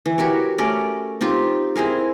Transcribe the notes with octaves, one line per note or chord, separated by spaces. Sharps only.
E3
F#4 G4 A#4 C#5
A3 C#4 A#4 D5
C4 D#4 F4 G4
C4 E4 G#4 A#4